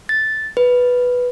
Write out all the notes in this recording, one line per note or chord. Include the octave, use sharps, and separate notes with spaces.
A6
B4